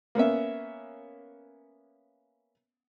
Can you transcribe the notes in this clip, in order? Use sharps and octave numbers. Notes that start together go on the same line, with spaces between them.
A#3 B3 C#4 E5